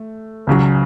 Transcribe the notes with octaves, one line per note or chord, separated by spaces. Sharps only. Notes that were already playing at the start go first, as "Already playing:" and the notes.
Already playing: A3
C#2 C#3 F#3